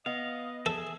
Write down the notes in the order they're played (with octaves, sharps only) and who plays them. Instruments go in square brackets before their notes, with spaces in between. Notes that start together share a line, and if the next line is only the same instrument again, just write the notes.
[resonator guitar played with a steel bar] B3 [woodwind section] D#5 [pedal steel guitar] F5
[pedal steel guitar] G#4 E5 [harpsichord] A4